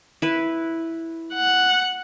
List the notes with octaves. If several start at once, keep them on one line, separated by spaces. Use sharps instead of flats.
E4 B4
F#5